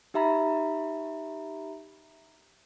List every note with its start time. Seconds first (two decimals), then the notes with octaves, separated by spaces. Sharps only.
0.14 D#4 G4 E5 A#5 B5